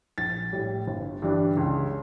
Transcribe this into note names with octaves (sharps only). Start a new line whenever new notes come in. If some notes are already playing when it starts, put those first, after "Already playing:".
A#1 A6
A2 G3
G1
G2 E3 G3 D4
C#2